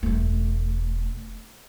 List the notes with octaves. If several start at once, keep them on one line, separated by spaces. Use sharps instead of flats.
E1 A3